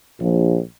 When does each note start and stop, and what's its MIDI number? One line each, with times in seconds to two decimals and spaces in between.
0.20 0.57 34